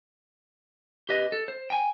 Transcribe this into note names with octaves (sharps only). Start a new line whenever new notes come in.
G4 B4 D#5
A4
C5
G5 G#5